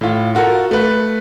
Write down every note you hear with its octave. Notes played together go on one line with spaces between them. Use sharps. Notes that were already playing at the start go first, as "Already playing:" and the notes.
A2 F4
F4 F#4 A4 A#4
A3 B4